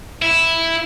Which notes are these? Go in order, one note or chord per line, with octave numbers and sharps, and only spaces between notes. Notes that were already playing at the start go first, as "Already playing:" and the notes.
E4